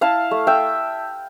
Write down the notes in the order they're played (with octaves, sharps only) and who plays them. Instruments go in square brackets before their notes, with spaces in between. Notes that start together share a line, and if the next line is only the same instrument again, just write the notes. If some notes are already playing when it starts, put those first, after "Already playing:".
[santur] E4 F5 A5
A3
E5 G5